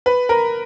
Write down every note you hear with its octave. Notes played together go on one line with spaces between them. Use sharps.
B4
A#4